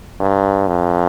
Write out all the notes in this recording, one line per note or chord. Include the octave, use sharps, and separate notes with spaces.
G2
F2